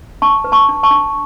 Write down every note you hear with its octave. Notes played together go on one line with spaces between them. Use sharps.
D4 A5 C#6
B4
A5 C#6
D4
A5 C#6
D4